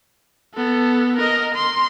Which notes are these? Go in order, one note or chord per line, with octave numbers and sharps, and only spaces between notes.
B3 A4
A#4 D#5
C6